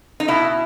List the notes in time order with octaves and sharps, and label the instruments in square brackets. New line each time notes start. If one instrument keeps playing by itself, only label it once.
[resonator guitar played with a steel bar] D#4
B2 E4